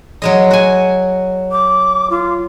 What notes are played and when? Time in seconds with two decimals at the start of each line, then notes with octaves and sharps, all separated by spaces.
0.22 F#3 G#3 D#5
0.51 F#4 G#5
1.52 D6
2.10 F4